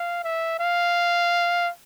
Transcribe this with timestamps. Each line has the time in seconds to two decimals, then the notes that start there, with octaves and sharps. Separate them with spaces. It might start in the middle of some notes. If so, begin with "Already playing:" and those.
Already playing: F5
0.24 E5
0.60 F5